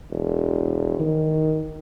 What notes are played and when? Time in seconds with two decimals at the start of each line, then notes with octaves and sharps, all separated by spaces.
0.11 E1
0.99 D#3